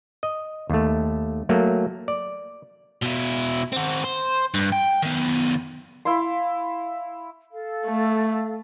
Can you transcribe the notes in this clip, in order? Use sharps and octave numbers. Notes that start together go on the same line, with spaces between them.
D#5
D#2 A3
F#3 A3 A#3
D5
B2 E4
C4 F#4
C5
G2
G5
D#3 B3
E4 F5 C6
A4 F5
A3